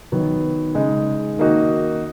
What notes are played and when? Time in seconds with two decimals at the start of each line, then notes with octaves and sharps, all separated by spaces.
0.12 D#3 F#3 B3
0.75 C#3 G#3 D#4
1.37 D#3 A#3 D#4 F#4